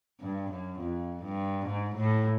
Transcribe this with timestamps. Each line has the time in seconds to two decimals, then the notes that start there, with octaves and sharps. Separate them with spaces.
0.21 G2
0.50 F#2
0.79 F2
1.23 G2
1.66 G#2
1.96 A2